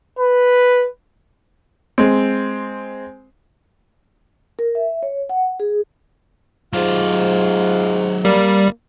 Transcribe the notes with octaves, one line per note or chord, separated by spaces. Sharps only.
B4
G#3 C4
A#4
E5
C#5
F#5
G#4
G#2 C3 F#3 F4 D5
G3 A#3